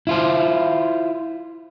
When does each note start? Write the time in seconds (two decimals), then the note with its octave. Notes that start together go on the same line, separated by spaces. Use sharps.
0.07 E4 F4 C5